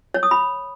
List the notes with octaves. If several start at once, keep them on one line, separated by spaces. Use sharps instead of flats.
C#5
D#6
B5